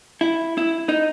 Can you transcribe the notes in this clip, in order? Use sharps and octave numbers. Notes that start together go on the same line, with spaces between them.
E4
E4
D#4